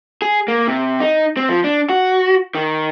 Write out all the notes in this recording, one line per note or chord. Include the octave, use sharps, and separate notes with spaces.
G#4
A#3
C3
D#4
C4
F3
D4
F#4
D#3